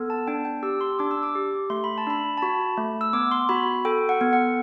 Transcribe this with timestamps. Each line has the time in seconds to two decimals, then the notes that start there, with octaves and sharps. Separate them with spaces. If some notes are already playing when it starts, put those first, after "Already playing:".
Already playing: B3 A4
0.10 A5
0.27 D4 G5
0.45 G5
0.63 G4 E6
0.81 C6
0.99 D4 D6
1.11 E6
1.23 D6
1.35 G4
1.70 A3 C6
1.84 B5
1.98 A5
2.07 D4 B5
2.38 A5
2.42 F#4 B5
2.77 A3
3.01 E6
3.13 B3 D6
3.31 C6
3.49 F#4 B5
3.85 A4 G5
4.09 F#5
4.21 B3
4.33 F#5